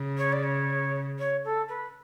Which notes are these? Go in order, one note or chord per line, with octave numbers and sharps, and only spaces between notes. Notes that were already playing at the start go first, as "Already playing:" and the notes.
Already playing: C#3
C#5
D5
C#5
C#5
A4
B4